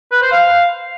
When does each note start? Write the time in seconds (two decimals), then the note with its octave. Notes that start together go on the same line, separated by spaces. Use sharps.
0.12 B4
0.22 C5
0.32 F5